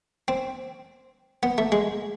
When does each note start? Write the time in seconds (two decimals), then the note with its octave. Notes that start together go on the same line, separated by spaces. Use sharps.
0.28 C4
1.43 B3
1.58 A3
1.72 G#3